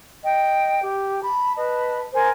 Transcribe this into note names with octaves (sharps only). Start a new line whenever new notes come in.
D#5 G5
G4
A5 B5
B4 D#5 A5
A#4 C5 G#5 C6